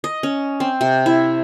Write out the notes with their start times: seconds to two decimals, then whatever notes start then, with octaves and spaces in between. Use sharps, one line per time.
0.04 D#5
0.23 C#4
0.60 C4
0.81 C3
1.06 E4